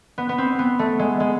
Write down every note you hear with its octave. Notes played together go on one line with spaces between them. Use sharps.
B3
B3
C4
B3
A3
G#3
G#3